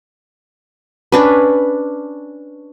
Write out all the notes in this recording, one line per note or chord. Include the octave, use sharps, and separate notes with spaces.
C#4 D4 B4